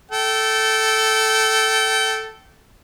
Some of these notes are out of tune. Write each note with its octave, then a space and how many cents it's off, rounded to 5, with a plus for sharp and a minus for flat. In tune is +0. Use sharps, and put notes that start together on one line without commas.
A4 +0 G5 -25